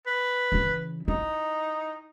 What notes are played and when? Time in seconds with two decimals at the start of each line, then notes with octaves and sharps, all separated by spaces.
0.06 B4
0.52 C#3 E3
1.08 D#4 E4